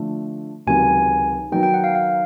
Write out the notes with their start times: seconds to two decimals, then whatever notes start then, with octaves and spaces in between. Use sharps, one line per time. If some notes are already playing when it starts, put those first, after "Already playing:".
Already playing: D3 F3 A3
0.67 C#2 C3 D#3 F#3 G#5
1.52 D#3 F#3 B3 D#4 G5
1.63 G5
1.74 F#5
1.84 F5
1.95 F5